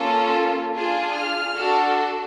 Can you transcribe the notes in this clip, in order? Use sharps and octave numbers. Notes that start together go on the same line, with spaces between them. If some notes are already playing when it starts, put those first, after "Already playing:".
Already playing: A#3 C#4 F4 A4
D4 F4 G#4
F6
D4 F#4 A4